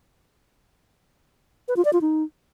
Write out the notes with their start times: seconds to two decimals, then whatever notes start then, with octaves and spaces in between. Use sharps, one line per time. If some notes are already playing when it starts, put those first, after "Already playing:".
1.68 B4
1.76 F4
1.85 D5
1.93 F4
2.01 D#4